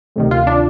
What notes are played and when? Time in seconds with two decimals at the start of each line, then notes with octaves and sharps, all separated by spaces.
0.16 D2 C3 D#3
0.31 F4
0.47 D4